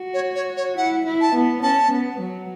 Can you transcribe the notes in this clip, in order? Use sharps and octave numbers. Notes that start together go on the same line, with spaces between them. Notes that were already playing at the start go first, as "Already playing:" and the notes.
Already playing: F#4
C#5
C#5
C#5
E4 F#5
E4
A5
B3
C#4 A5
B3
F#3